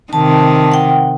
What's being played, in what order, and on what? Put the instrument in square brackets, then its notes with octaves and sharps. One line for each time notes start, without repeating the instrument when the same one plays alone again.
[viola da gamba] C3 D#3 [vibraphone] A5
[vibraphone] F#5 G5